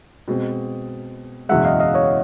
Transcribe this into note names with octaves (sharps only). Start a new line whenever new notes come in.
B2 G#3 C4
F#1 E2 B2 G#3 E5 F#5
D#5 F5
D#5 F5
C#5 D#5